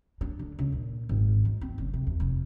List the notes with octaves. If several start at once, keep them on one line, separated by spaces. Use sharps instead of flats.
D4
D3
C#2
A#2
G#1
G#2
C4
F#1
C3
E2
F1